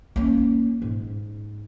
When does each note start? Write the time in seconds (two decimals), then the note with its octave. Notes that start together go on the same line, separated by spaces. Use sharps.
0.16 A#3 C#4
0.82 G#2